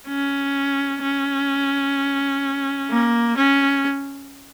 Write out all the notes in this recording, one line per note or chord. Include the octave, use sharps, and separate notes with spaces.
C#4
C#4
A#3
C#4